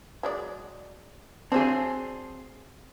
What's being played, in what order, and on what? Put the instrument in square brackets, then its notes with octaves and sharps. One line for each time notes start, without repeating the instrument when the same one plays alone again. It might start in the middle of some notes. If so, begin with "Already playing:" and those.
[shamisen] F#3 G#3 D5
[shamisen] F#3 D4 [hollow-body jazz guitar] C4 G#4